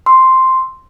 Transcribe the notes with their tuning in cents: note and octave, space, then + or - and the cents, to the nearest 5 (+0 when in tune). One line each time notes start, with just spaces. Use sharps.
C6 +0 E6 -5